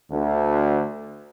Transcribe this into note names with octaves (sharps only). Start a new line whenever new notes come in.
D2